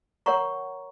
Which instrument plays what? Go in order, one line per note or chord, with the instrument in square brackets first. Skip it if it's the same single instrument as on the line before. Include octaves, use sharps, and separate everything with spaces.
[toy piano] A#4 C#5 F#5 A#5 C#6